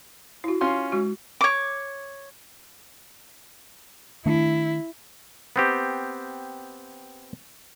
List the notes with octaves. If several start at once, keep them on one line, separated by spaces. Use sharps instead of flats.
E4 F#4
C#4 F4 C6
G#3 F#4
C#5 D6
D#3 A3 D4 E4
B3 C4 G4